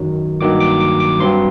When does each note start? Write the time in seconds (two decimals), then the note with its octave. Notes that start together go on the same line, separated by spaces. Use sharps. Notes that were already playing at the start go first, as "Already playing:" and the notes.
Already playing: F#2 D#3 F#3
0.41 G2 D#3 F#3 A#3 D6
0.60 D6
0.80 D6
1.00 D6
1.20 G2 F#3 C4 C6